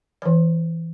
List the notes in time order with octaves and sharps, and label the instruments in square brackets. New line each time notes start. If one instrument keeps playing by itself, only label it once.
[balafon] E3 C#5